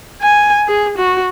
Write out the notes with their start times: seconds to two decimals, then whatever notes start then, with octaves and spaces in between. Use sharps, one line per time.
0.22 G#5
0.68 G#4
0.97 F#4